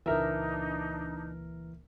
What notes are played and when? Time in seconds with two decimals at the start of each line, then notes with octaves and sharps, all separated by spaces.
0.06 C#2 A#2 E3 D4 D#4 A#4 E5